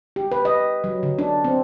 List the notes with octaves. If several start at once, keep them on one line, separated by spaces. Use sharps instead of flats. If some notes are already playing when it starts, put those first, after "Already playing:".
G4
B4
D#5
F#3
D3
D4
C4